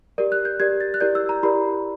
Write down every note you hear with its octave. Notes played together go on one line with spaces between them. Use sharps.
G4 A#4 D5
F#6
G6
G4 A#4 D5 G#6
A6
F#6
E4 G4 A#4 D5 G6
E6
A#5
E4 G4 A#4 D5 B5